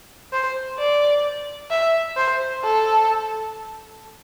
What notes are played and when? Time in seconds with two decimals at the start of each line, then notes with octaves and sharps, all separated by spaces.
0.33 C5
0.78 D5
1.70 E5
2.17 C5
2.63 A4